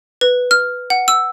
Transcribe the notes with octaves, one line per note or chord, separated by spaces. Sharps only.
B4
F6
F#5
E6